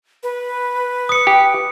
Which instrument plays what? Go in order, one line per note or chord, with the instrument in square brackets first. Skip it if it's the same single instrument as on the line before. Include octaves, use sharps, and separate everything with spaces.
[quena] B4
[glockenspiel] D#6 C#7
[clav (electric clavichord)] G4